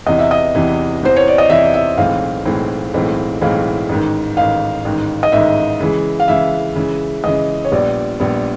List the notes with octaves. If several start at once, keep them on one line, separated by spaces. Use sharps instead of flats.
E2 C3 E3 D#5
E5
D#5
E2 C3 E3
E2 C3 E3 C5
C#5
D5
D#5
E2 C3 E3 E5
E5
B1 A2 E3 G#3 C4 F5
B1 A2 E3 G#3 C4
B1 A2 E3 G#3 C4
B1 A2 E3 G#3 C4 F5
A1 G#2 D#3
A1 G#2 D#3 F5
A1 G#2 D#3
D#5
A1 G#2 D#3 E5
C#3 E3 G#3
F5
C#3 E3 G#3 E5
C#3 E3 G#3
C#3 E3 G#3 D#5
C#5
A#1 A#2 G3 B3 D5
A#1 A#2 G3 B3